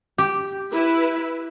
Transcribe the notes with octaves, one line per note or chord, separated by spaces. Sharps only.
G4
E4 B4